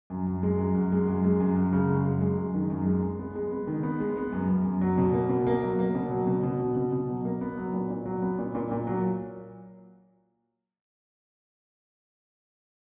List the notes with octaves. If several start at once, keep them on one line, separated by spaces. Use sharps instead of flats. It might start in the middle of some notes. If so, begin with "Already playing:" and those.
F#2
F#2
G#3
F#2
F#2
G#3
F#2
G#3
F#2
F#2
C#3
G#3
F#2
G#3
F#2
D#3
F#2
G#3
G#3
B3
G#3
B3
D#3
B3
G#3
B3
F#2
F#2
F#2
F#3
B2
A#3
B2
A#3
F#3
A#3
B2
F#3
B2
B2
B2
B2
B2
F#3
A#3
B3
F#3
A#2
A#2
F#3
B3
A#2
A#2
A#2
F#3